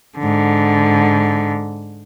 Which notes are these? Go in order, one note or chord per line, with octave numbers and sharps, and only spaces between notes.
G#2 D3